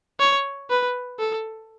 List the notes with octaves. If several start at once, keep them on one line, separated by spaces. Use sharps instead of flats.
C#5
B4
A4